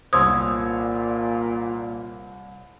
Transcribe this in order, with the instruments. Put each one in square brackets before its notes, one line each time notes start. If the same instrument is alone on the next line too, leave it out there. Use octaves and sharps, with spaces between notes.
[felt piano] C2 C#5 G#6 [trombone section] A#2 [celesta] C5 C6 E6 [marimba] D#6